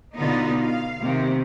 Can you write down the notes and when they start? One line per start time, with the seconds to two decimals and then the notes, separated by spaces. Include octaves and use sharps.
0.17 B2 D3 B3 D#4 F4
0.62 F5
1.02 C3 D#3